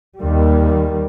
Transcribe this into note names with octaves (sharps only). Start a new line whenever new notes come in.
D#2 D#3 G3